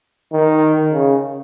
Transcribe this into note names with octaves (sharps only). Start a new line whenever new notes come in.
D#3
C#3